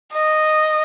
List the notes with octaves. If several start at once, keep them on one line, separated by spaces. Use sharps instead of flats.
D#5